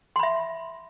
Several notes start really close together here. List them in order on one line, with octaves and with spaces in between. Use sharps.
C6 B5 E5